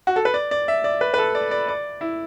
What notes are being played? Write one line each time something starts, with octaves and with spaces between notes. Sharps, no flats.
F#4
A4
B4
D5
D5
E5
D5
B4
B4
A4
D5
D5
D5
E4